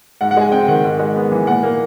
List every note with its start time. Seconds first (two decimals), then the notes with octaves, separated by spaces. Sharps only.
0.21 G#2 F#5
0.31 F#5
0.37 G#3 G#5
0.52 C4 G5
0.68 D#3 F#5
0.84 G#2
0.99 G#3
1.15 B3
1.32 E3
1.47 A#2 F#5
1.63 A#3